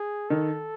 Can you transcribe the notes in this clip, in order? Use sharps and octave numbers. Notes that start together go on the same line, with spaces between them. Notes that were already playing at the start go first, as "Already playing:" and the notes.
Already playing: G#4
D#3 A4